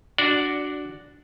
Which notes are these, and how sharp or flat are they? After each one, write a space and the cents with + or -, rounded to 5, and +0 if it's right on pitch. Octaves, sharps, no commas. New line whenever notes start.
D4 +0 F#4 +0 D5 -15